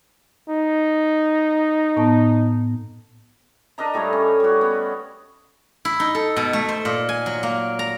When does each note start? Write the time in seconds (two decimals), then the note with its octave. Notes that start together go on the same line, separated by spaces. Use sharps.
0.49 D#4
1.97 A2 B3 A5
3.78 D4 A#4 D#5 A#5
3.94 A2 G3 A3 C#5
4.13 C#4
4.40 G3 F#4
4.61 B3
5.85 E4
6.00 D#4
6.15 A4
6.36 B2
6.53 A3
6.69 C5
6.85 A#2
7.09 G#5
7.26 F#3
7.43 A#3
7.79 A#5